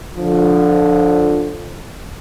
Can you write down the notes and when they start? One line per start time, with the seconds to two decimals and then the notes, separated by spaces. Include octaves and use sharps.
0.17 D3 F3